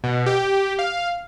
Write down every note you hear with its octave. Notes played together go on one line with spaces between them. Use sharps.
B2
G4
F5